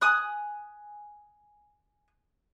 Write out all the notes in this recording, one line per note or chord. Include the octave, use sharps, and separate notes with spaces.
G#5 D#6 F#6